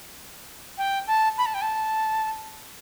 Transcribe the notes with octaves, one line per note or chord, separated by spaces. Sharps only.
G5
A5
B5
A5
G5
A5